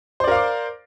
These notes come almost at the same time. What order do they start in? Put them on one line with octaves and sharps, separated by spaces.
C5 D5 A#4 F5 D6